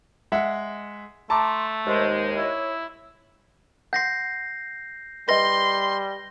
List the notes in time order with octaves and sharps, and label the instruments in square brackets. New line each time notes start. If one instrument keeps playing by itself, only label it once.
[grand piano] G#3 E5 F#5
[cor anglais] A3 [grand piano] A5 A#5 D6 [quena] C6
[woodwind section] D#2 G#3 [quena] C5
[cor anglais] E4 [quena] C#5
[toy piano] F#5 C6 [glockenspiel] G6 A#6 C7
[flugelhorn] G3 [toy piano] B4 D#5 [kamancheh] C6 [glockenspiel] A#6 G7